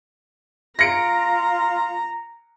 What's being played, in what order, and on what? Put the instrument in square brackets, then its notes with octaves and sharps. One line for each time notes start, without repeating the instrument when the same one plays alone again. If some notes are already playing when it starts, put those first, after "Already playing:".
[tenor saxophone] F4 [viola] A#5 [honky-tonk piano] A#6 C#7 D7